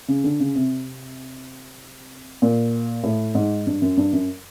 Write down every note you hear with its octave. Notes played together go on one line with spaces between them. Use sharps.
C#3
D3
C#3
C3
A#2
A2
G#2
G2
F#2
G2
F#2